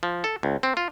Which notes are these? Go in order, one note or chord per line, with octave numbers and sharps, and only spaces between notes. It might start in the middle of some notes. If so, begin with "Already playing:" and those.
F3
A4
C#2
C4
F4